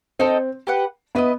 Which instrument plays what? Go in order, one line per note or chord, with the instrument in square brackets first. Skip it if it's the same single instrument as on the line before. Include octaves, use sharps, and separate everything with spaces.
[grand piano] C4 [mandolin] D#4 A4 D#5 G5
[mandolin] G4 B4 F#5
[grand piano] B3 [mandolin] E4 B4 D#5